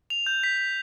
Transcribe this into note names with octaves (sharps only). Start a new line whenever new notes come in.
F7
G6
B6
B6